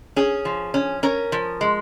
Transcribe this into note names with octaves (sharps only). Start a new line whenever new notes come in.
C#4 G#4
F3
C#4
C#4 A#4
F3
G#3